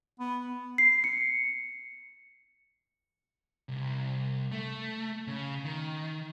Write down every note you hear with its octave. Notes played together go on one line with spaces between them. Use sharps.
B3
C7
C#7
C2
A3
C#3
D#3